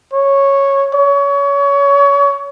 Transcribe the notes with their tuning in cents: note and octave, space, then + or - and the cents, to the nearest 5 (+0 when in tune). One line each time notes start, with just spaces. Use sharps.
C#5 -5
C#5 +25